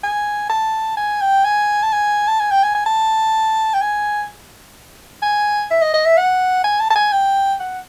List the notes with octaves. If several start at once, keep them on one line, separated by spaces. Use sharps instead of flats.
G#5
A5
G#5
G5
G#5
A5
G#5
A5
G#5
G5
G#5
G#5
A5
G5
G#5
G#5
E5
D#5
D#5
E5
F#5
G#5
A5
A5
G#5
G5
F#5